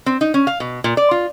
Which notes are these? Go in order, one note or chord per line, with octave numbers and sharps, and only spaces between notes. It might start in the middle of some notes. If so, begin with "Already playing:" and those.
C4
D#4
C#4
F5
B2
A#2
D5
F4